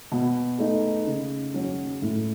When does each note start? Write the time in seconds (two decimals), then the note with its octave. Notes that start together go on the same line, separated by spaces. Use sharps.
0.12 B2
0.58 A3 D#4
1.07 C#3
1.54 F#3 C#4
2.02 A2